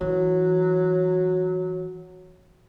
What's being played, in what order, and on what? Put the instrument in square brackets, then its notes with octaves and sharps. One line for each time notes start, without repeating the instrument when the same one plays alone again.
[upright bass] E3 [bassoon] F#3